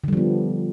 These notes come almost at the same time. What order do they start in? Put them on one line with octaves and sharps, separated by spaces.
D3 G3 F3 B3